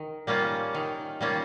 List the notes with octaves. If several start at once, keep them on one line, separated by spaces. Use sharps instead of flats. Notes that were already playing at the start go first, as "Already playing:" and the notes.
Already playing: D#3
G3 A#3 C#4 F4
D#3
G3 A#3 C#4 F4